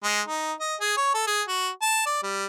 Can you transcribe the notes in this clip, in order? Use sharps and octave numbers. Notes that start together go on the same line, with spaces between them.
G#3
D#4
D#5
G#4
C#5
A4
G#4
F#4
A5
D5
G3